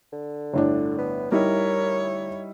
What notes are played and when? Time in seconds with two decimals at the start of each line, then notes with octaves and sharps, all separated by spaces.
0.13 D3
0.54 G1 A2 D4
0.98 B3
1.32 G3 D#4 E4 A#4 C#5